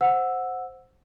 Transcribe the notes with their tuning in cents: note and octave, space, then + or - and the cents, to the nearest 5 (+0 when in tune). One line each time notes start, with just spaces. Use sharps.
C5 +0 F#5 -10 E6 +0